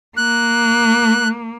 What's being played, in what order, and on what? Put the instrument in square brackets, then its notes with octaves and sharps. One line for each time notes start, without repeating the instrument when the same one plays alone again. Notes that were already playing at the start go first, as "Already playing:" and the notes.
[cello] A#3 [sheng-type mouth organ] F#6